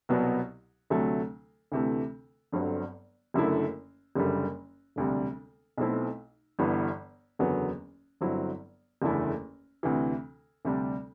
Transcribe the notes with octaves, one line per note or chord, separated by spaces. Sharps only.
C2 B2 F#3 B3
D2 C3 F#3 A3
D2 C3 E3 A3
G1 G2 D3 F#3 C4
F#1 F#2 D3 A3 E4
F#1 F#2 D3 G3
E1 D2 C3 G3
B1 B2 A3 C4 E4
G1 G2 E3 B3
F#1 E2 D3 F#3 B3
G1 G2 F#3 C4 E4
F#1 E2 D3 A3 E4
D2 C3 E3
D2 C3 G3 D4